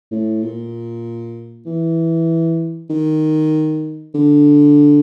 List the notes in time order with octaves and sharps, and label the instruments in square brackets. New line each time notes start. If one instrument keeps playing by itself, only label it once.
[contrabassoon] A2
A#2
E3
D#3
D3